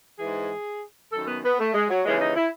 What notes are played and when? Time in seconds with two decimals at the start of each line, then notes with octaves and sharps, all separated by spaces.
0.19 G#2 E3 G#4
1.11 F#2 D#3 A4
1.27 B3
1.43 B3
1.59 A3
1.74 G#3
1.90 F#3
2.05 D#2 C#3 E3 G#3
2.21 D#4
2.36 E4